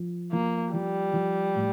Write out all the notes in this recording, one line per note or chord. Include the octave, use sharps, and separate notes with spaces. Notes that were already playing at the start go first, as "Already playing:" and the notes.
Already playing: F3
F3 A#3
F3 G3
F3
A2